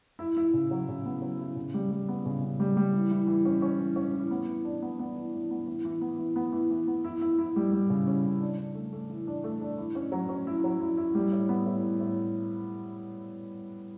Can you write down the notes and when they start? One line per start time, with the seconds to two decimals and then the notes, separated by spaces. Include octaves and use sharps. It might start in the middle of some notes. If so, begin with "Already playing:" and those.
0.19 E4
0.37 E4
0.53 C#3
0.71 F#3
0.89 C#3
1.06 B3
1.22 F#3
1.40 E4
1.56 C#3
1.74 G3
1.91 G3
2.08 B3
2.25 C#3
2.41 C#3
2.60 G3
2.77 G3
2.94 E3
3.11 E3
3.27 E3
3.45 C#4
3.62 C#4
3.80 E3
3.96 C#4
4.13 E3
4.31 B3
4.47 E3
4.64 D4
4.82 B3
4.99 B3
5.15 E3
5.33 E3
5.51 B3
5.67 E3
5.85 E3
6.01 B3
6.18 E3
6.36 B3
6.52 E3
6.70 E3
6.87 B3
7.04 E4
7.21 E4
7.38 E4
7.56 G3
7.72 G3
7.90 C#3
8.07 C#4
8.25 C#3
8.41 D4
8.58 D4
8.75 A3
8.92 A3
9.10 E3
9.27 D4
9.44 A3
9.61 D4
9.78 E4
9.95 C#4
10.12 F#3
10.29 C#4
10.47 E4
10.64 F#3
10.81 E4
10.97 E4
11.15 G3
11.32 A2
11.49 B3
11.66 A2
11.83 A2
12.00 A2